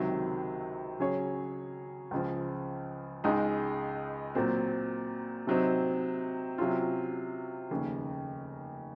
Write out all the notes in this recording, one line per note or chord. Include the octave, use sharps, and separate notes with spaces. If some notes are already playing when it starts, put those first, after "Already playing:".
Already playing: C#2 C3 D#3 F#3 C4
C#3 F#3 C#4 G#4 C#5
C#2 C#3 F3
C#2 C#3 G#3 D#4
A#2 F#3 C4
C3 F#3 C4 D#4
C3 F#3 C#4 F4
F1 D#2 C#3